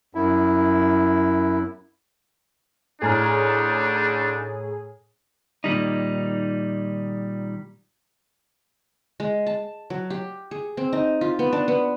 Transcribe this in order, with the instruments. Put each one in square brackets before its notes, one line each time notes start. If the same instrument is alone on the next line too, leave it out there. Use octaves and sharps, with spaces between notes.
[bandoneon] F#2 E4
[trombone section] D2 C#3 D#4 [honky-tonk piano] A2 A#5 F6 [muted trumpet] D4 [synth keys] G#4
[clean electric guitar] A#2 D#3 G3 D#4
[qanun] G#3
A5
F#3
G4
G#4
C4
D#4
F4
B3
D4
B3